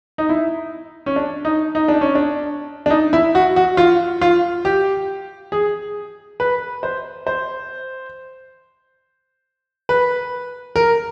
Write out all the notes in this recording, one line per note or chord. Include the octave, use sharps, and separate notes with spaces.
D#4
E4
C#4
D4
D#4
D#4
D4
C#4
D4
D4
D#4
E4
F#4
F#4
F4
F4
G4
G#4
B4
C5
C5
B4
A#4